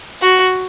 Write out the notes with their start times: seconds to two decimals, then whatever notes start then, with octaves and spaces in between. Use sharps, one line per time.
0.22 F#4